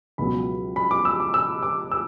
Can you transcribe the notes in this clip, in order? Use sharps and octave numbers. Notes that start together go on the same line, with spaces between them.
C#2 B2 F#3 B5
B5
D6
E6
D6
E6
D6
E6